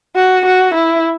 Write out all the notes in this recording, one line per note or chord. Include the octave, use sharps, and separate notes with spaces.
F#4
F#4
E4